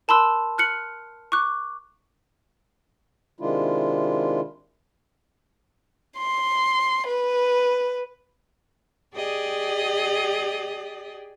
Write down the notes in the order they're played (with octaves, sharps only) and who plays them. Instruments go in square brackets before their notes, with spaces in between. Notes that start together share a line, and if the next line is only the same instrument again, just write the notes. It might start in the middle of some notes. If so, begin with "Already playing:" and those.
[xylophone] A#4 A5 B5 C6 E6 F#6
F6 F#6 C#7 F#7
C#6 D6 F#6
[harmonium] C3 D#3 G#3 D4 E4 F4
[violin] C6
B4
[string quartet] G4 G#4 D5 D#5